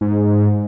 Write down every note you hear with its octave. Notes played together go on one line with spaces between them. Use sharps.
G#2